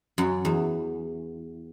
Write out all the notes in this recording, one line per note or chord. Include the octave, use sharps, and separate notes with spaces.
F#2
E2